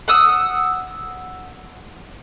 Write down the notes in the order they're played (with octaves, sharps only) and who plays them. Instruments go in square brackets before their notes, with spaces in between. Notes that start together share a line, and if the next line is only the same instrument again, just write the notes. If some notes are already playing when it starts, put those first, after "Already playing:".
[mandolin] F#5 D#6 E6